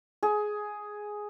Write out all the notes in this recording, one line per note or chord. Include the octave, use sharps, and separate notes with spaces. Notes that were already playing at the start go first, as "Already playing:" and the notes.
G#4